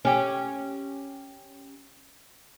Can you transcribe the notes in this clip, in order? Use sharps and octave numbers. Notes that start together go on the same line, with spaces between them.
C#4 G4